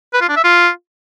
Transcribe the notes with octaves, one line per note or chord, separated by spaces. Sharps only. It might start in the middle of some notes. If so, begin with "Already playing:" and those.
B4
F4
D4
E5
F4